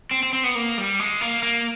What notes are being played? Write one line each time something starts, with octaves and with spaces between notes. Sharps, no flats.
C4
C4
C4
B3
A#3
G3
G#3
A#3
A#3